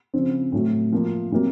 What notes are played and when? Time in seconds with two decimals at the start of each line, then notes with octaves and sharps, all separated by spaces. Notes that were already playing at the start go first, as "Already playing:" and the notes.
0.14 C#3 F3 C4
0.52 A2 F#3 A3
0.92 F3 A#3 F4
1.32 C3 F#3 A#3